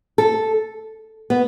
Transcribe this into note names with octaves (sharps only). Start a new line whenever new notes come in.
A4
B3